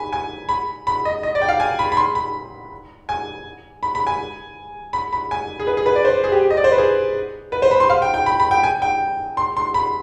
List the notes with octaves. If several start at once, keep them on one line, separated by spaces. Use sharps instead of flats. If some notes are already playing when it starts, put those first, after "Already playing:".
Already playing: G#5 B5
G#5
B5
B5
D#5
D#5
D5
G5
F5
G#5
B5
B5
C6
B5
G#5
B5
B5
G#5
B5
B5
G#5
G#4
B4
G#4
B4
D5
C5
G#4
G4
D#5
D5
C5
B4
G#4
B4
C5
B5
C6
F5
G5
G5
B5
B5
G5
G#5
G5
C6
C6
B5